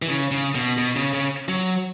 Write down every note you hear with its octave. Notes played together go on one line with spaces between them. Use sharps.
E3
C#3
C#3
B2
B2
C#3
C#3
F#3